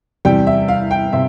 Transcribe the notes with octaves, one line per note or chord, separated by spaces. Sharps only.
E2 C3 G3 G5
E5
F5
G5
C3 E5